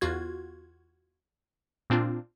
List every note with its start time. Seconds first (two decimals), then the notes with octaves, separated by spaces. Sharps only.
0.01 E2 F4 F#4 G#6
1.90 A#2 C4 D4 F4